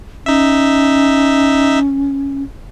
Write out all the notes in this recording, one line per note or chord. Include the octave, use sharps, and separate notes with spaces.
C#4 D#4 E5